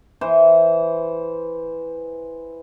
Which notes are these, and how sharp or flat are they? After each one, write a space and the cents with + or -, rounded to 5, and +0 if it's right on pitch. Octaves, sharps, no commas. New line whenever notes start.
E3 +0 C5 +0